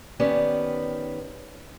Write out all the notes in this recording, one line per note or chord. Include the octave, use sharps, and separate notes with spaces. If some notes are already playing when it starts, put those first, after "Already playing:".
D#3 B3 C#4 G4 D5